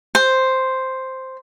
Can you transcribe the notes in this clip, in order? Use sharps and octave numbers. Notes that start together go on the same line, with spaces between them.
C5